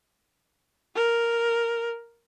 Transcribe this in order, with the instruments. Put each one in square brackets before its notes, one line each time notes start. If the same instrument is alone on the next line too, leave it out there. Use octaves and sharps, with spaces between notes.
[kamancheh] A#4